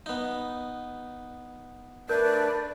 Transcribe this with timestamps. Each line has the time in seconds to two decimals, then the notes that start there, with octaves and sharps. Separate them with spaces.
0.06 B3 D#4
2.09 A3 D4 A#4 B4 D5 G6